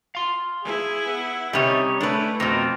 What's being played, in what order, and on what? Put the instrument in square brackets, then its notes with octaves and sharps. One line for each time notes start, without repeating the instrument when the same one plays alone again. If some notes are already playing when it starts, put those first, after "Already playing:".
[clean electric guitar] F5 C6
[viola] E4 [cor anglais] G#4
[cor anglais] B3
[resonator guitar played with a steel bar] C3 G3 [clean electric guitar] C#4 C#5 [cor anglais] D#4
[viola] A3 [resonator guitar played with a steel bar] D4 B4 [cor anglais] E4
[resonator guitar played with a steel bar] F2 B2 [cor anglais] C4 [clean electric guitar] D#4 A#4